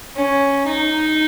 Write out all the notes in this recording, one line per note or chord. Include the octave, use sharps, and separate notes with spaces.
C#4
D#4